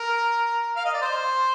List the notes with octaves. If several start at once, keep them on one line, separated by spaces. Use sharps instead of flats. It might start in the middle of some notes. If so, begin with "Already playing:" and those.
Already playing: A#4
F5
D#5
D5
C5